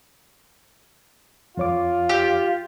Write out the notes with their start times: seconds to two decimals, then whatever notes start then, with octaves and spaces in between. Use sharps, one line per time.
1.57 F2 F4 C#5 D6
2.09 G4